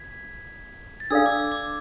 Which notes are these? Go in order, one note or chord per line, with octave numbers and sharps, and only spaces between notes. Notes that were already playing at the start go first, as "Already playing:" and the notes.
Already playing: G#6 B6
A6
D4 A4 D5 F5 E6 G#6
D6
E6
D6